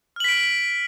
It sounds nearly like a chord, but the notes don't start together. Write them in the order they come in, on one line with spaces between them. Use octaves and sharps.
F6 F#7 B6 D7